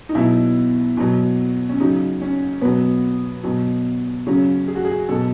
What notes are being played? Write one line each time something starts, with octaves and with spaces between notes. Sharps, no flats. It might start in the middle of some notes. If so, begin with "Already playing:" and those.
D#4
B2 F#3 E4
B2 F#3
C#4
C#3 F#3 D#4
C#4
B2 F#3 B3
B2 F#3
C#3 F#3 C#4
G#4
F#4
G#4
B2 F#3 A4